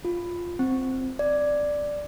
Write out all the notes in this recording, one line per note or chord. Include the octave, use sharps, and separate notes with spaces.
F4
C4
D5